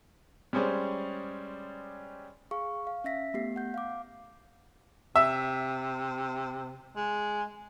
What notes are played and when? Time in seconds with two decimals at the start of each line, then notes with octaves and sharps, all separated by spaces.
0.53 G3 G#3 C#4 G#4 C5 D5
2.51 G#4 F5 C#6
2.87 F5
3.04 C#4 E5 A#6 B6
3.34 A3 B3 G4 C7
3.56 F#5 G6
3.74 F5 D6
5.16 C3 E5
6.96 G#3